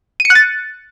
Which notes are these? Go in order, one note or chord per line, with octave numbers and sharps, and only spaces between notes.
D#7
C#7
F#6
A6